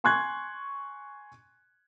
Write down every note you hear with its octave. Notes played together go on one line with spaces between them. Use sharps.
G#5 C6 C#6 F#6 G#6